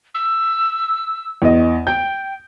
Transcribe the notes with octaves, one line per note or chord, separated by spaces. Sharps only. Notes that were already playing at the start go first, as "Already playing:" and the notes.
E6
E2 D#5
G5 G6